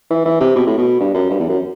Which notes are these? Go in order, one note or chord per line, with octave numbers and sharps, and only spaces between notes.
E3
E3
C3
B2
A2
B2
G2
F#2
G2
E2
F#2